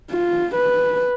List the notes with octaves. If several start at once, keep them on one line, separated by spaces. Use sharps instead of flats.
F4
B4